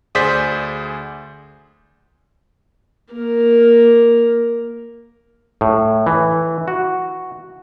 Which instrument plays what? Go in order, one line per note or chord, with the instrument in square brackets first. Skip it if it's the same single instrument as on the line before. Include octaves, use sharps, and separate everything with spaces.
[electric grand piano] D2 G#4 C5 D5 G6 B6
[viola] A#3 A#4
[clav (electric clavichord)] A2
E3
F#4